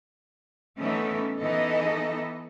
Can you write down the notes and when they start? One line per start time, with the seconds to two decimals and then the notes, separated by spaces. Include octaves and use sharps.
0.79 E3 A3 B3 C#4 D#4 A4
1.39 E3 B3 D#4 A4 D#5